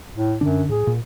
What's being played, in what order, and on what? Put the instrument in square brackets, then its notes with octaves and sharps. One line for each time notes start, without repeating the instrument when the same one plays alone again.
[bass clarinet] A2
[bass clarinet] F#2 [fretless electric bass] D3 D4
[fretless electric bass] A2 [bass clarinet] G#4
[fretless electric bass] A#2